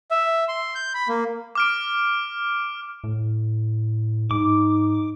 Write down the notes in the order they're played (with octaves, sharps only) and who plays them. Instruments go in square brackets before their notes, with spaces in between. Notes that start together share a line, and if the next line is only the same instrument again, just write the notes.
[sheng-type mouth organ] E5
C6
G6
B5
A#3
[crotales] D6 F6 D7
[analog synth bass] A2
[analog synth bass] G#2 [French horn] D#4 [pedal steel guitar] D6